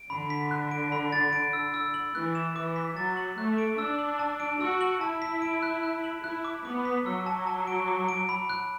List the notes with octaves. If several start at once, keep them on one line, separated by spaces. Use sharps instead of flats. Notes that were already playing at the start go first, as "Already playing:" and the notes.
Already playing: D7
D3 B5
B6
F#6
D7
B5
A6
D7
E6
E6
F#7
E3 F#6
E7
E3 D6
B6
F#3 A6
F#7
A3 F#6
D7
D4 E6
F#7
A5
D7
F#4 E6
F#7
E4 A5
B6
D7
F#6
F#6
F#7
E4 F#6
D6
B3 D6
B6
F#3 E6
A5
A5
D7
D6
D7
B5
F#6